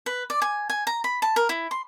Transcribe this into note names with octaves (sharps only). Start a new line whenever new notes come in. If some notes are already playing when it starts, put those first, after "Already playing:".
B4
D5
G#5
G#5
A#5
B5
A5
A#4
E4
C6